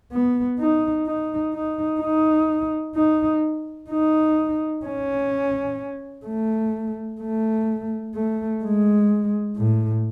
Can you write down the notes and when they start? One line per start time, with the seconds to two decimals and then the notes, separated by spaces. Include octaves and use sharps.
0.12 B3
0.59 D#4
1.07 D#4
1.54 D#4
2.01 D#4
2.95 D#4
3.90 D#4
4.85 C#4
6.26 A3
7.21 A3
8.15 A3
8.63 G#3
9.57 A2